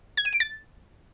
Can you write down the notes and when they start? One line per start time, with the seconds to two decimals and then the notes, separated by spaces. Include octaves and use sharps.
0.17 G#6
0.25 D#7
0.33 D7
0.40 A6